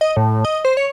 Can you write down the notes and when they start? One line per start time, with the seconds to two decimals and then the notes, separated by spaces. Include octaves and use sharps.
0.01 D#5
0.16 A2
0.45 D#5
0.65 C5
0.77 C#5